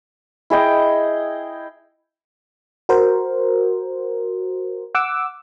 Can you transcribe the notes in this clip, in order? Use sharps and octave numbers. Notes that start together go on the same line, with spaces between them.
E4 G#4 D#5 G5
F#4 A#4 C5
F#5 D6 E6